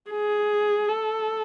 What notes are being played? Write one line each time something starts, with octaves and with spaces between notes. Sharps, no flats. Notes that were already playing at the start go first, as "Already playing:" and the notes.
G#4
A4